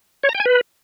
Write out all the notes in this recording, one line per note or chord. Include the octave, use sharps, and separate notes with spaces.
C#5
A#5
G5
G#5
B4